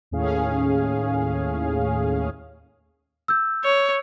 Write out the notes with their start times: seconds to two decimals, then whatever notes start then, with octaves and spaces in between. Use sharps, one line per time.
0.11 D#2 A2 C#4 G#4 F5
3.28 E6 G6
3.64 C#5